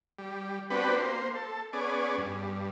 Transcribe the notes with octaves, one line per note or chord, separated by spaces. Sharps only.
G3
B3 C4 D4 F#4 G4 B4
A#3 C5
A4
B3 C#4 G#4 D5
G2